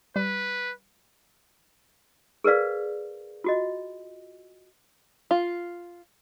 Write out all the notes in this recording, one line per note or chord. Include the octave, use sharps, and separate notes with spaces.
G3 B4
G#4 A#4 B4 D5 F5
F4 F#4 D#5
F4